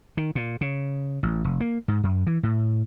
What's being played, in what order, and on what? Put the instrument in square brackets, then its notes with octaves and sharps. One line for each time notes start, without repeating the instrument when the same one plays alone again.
[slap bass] D#3
A#2
C#3
A1
F1
A#3
G#2
F#2
E3
A2